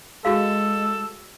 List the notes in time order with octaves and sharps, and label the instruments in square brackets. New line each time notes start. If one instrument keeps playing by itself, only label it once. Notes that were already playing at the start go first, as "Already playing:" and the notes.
[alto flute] G#3 [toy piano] F#4 G#4 F5 [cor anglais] A4